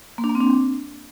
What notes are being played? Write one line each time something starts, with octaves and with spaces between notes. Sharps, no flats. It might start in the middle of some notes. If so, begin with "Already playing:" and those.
A#3
D4
A#3
C4
D4